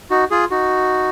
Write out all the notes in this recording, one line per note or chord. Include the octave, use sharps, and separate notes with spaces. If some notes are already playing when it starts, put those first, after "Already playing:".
D#4 F#4
F4 G#4
D#4 F#4